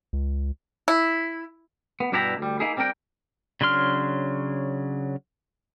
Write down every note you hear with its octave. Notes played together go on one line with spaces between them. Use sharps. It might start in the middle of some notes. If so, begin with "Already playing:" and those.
C#2
E4
B3
G2 B2 D4 E4 G4 A#5
D2 G3
A#3 D#4 E4 G#4
G3 C4 D4 A#4 G5
C#3 F#3 D4 C6 F6